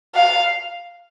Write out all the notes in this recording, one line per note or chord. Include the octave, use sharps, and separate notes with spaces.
F5